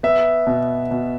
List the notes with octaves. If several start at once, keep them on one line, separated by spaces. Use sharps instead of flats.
B3 E5
B2
B2